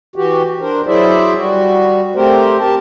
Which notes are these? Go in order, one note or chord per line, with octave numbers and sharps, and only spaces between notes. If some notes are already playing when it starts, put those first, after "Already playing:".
E3 F#4 G4
D4 A#4 C5
F#3 E4 G#4 C5 D5 E5
G3 F#4
A3 C4 G4 A#4 C5
G4 A#4 A5